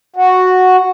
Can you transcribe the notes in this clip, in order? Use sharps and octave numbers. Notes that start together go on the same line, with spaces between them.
F#4